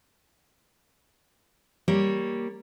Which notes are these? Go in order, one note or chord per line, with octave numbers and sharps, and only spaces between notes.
G3 A#3 C#5